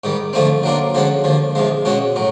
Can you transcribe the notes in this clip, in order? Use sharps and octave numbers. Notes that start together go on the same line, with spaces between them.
G#2 D#3 G3
F2 D3 F3 A3 C4
F#3 A#3 D4 F4
D3 F3 G#3 C#4 F#4
D#2 D3 F3
E2 C3 F3 G#3
B2 G#3 C#4 F#4
A2 F#3